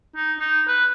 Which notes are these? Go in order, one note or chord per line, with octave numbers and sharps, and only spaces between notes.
D#4
D#4
B4